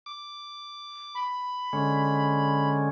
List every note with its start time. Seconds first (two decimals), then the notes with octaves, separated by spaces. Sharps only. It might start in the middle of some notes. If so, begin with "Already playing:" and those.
0.06 D6
1.15 B5
1.73 D3 G#3 C#4